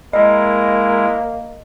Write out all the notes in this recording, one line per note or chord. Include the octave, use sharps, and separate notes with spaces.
G#3 A#3 E4 A#4 D#5